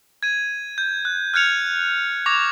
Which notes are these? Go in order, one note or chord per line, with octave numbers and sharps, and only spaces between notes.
G#6 D#7
G6
F#6
F6 F#6 G#6 C#7 F7
C#6 D6 G#6 A#6 F7